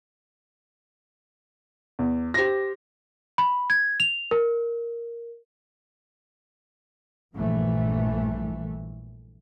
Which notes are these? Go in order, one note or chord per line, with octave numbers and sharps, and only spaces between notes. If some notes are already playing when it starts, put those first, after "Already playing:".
E2
G4 C5 A#6
B5
G#6
F7
A#4
A#1 G2 E3 A3